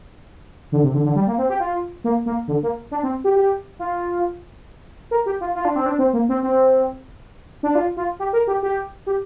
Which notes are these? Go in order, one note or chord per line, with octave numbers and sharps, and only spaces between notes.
D3
C3
D3
D3
G3
A#3
C4
G4
F4
A#3
A#3
D3
A#3
D4
C4
G4
G4
F4
A#4
G4
F4
F4
D4
C4
D4
C4
A#3
C4
C4
D4
F4
F4
G4
A#4
G4
G4
G4